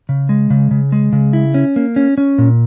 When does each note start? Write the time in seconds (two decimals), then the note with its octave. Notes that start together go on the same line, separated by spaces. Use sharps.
0.09 C#3
0.29 G#3
0.50 C#3
0.71 C#3
0.92 G#3
1.13 C#3
1.33 E4
1.54 C#4
1.76 A#3
1.96 C#4
2.18 C#4
2.38 A#2